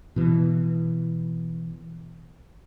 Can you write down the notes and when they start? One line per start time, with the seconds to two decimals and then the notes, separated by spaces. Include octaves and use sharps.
0.16 B2 E3